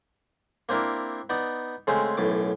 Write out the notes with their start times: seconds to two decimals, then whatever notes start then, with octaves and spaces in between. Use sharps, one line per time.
0.69 A#3 C4 D4 E4 A#4
1.30 B3 D#4 D5
1.87 C#3 G#3 A3 C4 C#4
2.17 B1 F#2 A2 D6